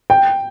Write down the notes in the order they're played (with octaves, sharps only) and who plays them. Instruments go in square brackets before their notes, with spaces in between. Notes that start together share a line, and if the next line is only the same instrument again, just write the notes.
[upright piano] G5